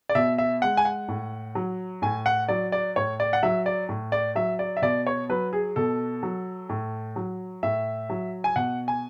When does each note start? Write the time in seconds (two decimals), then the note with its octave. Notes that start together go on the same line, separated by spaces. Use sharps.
0.09 D5
0.15 B2 E5
0.38 E5
0.62 G#3 F#5
0.77 G#5
0.85 F#5
1.08 A2
1.55 F#3
2.02 A2 G#5
2.26 F#5
2.48 F#3 D5
2.72 D5
2.96 A2 C#5
3.20 D5
3.33 F#5
3.43 F#3 E5
3.66 D5
3.89 A2
4.12 D5
4.35 F#3 E5
4.59 D5
4.77 E5
4.82 B2 D5
5.07 C#5
5.29 F#3 B4
5.53 G#4
5.76 B2 A4
6.23 F#3
6.69 A2
7.16 F#3
7.63 A2 E5
8.10 F#3
8.44 G#5
8.56 B2 F#5
8.88 G#5